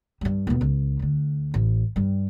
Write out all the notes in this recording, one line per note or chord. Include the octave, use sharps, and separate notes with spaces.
G2 G3
D#2 B2
C#2
D2 D3
A1
G2 G3